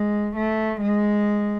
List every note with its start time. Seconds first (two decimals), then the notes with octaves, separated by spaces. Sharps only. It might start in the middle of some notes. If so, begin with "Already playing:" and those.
Already playing: G#3
0.36 A3
0.81 G#3